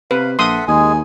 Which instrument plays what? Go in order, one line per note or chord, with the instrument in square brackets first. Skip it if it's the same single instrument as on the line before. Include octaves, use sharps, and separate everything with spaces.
[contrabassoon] C3 [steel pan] B4 [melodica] F5
[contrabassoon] A#1 [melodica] A4 E5 F#5 [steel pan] C6 D#6
[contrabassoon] D#2 [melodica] G#3 G#4 [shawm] G#5